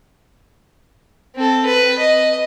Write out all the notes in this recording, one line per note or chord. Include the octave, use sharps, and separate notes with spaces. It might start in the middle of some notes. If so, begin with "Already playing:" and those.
C4 A4
B4
D#5